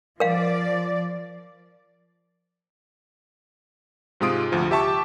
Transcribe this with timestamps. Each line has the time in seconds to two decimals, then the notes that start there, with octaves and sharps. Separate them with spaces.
0.20 F3 A#4 D5 F5
4.20 G#2 C3 G#3 F4 D#6 D7
4.52 D2 F3
4.71 G4 E5 A5 C#6 D6